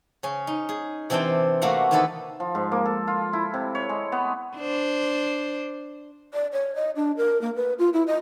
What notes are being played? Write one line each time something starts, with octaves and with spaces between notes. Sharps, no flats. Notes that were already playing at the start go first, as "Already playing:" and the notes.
C#3 C#4
D#4
G#4
C3 E3 C4 D4 C5 G5
C3 A3 A#3 F#4 F5 F#5
D#3 E3 B3 D4 A4 B4
F3
G#2
A#3
A4
F4
E4
C3
C#5
G#3
B3
D4 C5
D5
C#5
D#5
D4
A#4
A#3
B4
F4
E4
D#5